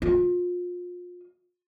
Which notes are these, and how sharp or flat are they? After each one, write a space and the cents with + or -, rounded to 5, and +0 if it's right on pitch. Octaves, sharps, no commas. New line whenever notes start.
F4 +30